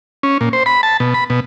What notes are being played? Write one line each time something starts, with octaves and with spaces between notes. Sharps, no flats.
C#4
A#2
C5
B5
A5
B2
B5
B2